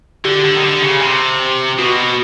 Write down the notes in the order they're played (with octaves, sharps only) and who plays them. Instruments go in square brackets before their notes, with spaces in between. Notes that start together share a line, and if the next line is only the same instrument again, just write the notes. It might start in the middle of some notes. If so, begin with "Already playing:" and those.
[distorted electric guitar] D3 [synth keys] G4
[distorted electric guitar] D3
D#3
D3
C#3
C3
[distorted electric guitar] B2 [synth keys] F#4